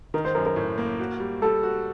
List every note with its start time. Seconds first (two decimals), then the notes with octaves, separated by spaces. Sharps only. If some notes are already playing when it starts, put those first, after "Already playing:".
0.14 D#3 A#4
0.25 C5
0.35 F#2 A#4
0.46 A#4
0.56 A2
0.78 A#3
1.00 F#4
1.20 G3
1.42 G3 A4
1.63 F#4